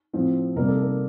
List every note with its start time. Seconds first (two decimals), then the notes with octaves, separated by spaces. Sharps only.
0.13 A2 F3 C4
0.56 C3 G3 A#3 A#4
0.68 A4
0.82 A#4